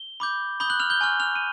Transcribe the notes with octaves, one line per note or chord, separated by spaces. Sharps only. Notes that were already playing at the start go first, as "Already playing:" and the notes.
Already playing: G7
B5 D6 G6
B5 D#6 G6 G7
F#6 F#7
F6 F7
G6 G7
G#5 C#6 F6
F6 F7
D#7